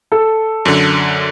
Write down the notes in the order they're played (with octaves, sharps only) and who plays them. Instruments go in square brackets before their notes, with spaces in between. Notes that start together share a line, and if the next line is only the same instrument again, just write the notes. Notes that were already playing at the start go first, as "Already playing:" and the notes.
[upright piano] A4
[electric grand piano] F#2 D3